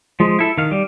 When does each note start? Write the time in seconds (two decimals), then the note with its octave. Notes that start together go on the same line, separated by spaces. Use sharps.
0.20 F3 G#3
0.39 E4 A4
0.58 D#3 F5
0.71 G3